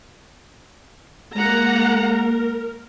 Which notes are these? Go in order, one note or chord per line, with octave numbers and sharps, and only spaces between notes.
G#3 A#3 F#5 A#5
A#4